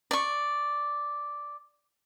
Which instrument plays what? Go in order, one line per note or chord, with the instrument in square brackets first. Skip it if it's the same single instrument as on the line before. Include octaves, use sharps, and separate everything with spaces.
[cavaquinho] D5 C#6